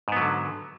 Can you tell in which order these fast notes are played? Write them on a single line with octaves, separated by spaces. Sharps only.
G#2 B3 F#3 D3